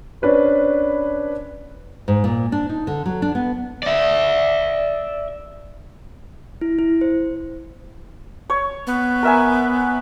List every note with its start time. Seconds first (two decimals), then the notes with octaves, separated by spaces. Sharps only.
0.22 C#4 D4 B4 C5
2.08 G#2
2.24 A#2
2.52 D4
2.69 D#4
2.87 D3
3.06 F#3
3.22 D4
3.35 B3
3.83 D5 E5
6.61 E4
6.79 E4
7.01 C5
8.50 C#5
8.87 B3
9.23 A#4 E5 G#5